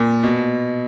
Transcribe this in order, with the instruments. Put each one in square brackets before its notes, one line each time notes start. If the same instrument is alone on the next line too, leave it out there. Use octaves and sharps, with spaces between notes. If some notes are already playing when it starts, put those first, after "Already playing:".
Already playing: [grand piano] A#2
B2